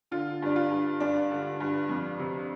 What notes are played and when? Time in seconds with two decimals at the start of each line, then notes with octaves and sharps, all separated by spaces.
0.11 D3 F4
0.42 G2 D4
0.56 F4
0.71 G2
1.00 G2 D4
1.31 D3
1.60 G2
1.89 F2
2.19 C3